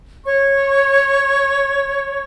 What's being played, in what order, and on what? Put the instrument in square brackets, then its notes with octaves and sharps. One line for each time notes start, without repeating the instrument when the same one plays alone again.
[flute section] C#5 C#6